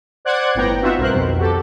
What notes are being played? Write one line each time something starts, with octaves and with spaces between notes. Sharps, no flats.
C5 D5 F#5 F#6 G#6
G1 A2 B3 G5 A#5
C4 D#4 F4 F#4 E5 F#5
B1 G2 A#4 C5 F#6
F2 B2 D#3
F#4 G4 A4